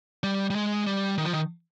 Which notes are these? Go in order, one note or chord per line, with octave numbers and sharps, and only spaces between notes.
G3
G3
G#3
G3
D#3
F3
D#3